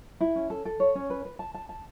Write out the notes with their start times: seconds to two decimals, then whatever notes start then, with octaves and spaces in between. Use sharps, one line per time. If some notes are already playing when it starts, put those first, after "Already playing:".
0.21 E4
0.36 C#4
0.50 A4
0.65 A4
0.80 C#5
0.95 C#4
1.10 B4
1.25 B4
1.39 A5
1.55 A5
1.69 A5